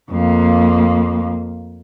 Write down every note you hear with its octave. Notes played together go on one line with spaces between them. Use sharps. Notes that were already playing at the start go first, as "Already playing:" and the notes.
F2 A#3